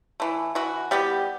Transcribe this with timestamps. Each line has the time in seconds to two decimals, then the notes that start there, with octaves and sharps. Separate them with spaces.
0.20 E3 A3
0.55 E3 F#4
0.91 G3 B3 G4